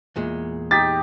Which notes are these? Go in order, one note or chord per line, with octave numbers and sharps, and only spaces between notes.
E2 A#2 G#3
D#4 G4 A6 B6